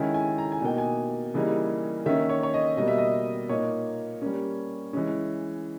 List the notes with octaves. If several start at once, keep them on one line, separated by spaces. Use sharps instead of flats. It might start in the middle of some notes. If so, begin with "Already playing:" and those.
Already playing: D#3 G#3 C#4 E4 G#5
G#5
A#5
G#5
B2 A#3 D#4 G5
G#5
C#3 E3 G3 A#3 D#4
D#3 A#3 C#4 E5
C#5
C#5
D#5
B2 G3 A#3 D#5
E5
D#5
A#2 A#3 D#4 C#5
G3 A#3 C#4
E3 G#3 C#4